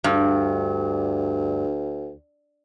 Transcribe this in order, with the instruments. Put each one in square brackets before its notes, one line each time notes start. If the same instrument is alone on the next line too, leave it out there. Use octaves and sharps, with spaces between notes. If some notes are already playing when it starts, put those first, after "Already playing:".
[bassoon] D2 [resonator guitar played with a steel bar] G2